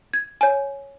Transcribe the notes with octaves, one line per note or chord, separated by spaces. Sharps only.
G#6
C#5 G#5